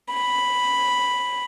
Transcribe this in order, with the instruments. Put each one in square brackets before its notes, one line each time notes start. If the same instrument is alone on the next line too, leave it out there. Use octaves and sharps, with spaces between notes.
[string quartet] B5